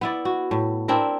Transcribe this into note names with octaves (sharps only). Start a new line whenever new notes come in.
B3 E4 D5
F#4
A2
C4 D4 E4 A#4